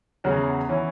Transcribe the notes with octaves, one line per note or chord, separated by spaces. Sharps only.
E2 C#3 F#3 C#4 F#4
E3 C#4 E4